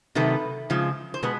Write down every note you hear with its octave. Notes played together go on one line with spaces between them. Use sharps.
C3 D#3 F#3 A3 B4
C#3 F3 G#3
C5
B2 G#3 B3 B4